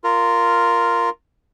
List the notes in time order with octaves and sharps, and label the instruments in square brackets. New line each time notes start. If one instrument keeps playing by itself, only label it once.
[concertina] F4 A#4